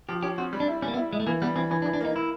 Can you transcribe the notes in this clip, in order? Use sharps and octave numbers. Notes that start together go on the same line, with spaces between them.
F3 G4
C#4 G4
C4 F#4
G3
D4
E4
G3 C#4
A#3
B3
E4
G#3 E4
A3
E3 A#3
G3 B3
E3 C4
E3 C#4
D4
E3
D4
A#3 D#4
A#3 E4